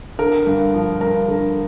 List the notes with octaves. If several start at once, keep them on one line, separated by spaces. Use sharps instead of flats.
D3 A#4
G2
F3
G2 A#4
D3